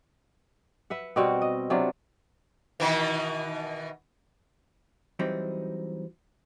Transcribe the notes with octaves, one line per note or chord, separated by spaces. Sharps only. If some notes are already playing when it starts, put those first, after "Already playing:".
B4 E5 F#5
B2 G3 C4 F#4
D#5
C3 F#3 D4 F4
B2 D#3 E3
E3 F#3 G3 C4 D#4